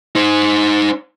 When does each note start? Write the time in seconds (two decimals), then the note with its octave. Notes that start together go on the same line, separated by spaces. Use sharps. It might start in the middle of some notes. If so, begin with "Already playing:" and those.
0.15 D#4 C5